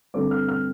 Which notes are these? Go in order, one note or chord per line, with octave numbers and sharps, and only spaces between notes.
G2 D3 A3 C4 D6
F6
F6